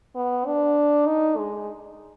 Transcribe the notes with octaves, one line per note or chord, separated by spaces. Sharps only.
B3
D4
D#4
G#3